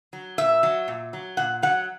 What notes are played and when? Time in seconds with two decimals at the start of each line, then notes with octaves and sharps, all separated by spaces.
0.13 F#3
0.38 A#2 E5
0.63 F#3
0.88 A#2
1.13 F#3
1.37 A#2 F#5
1.62 F#3 F#5